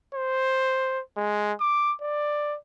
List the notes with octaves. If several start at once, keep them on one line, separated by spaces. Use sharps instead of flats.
C5
G#3
D6
D5